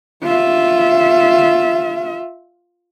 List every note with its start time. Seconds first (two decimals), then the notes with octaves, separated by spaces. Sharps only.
0.23 F4 E5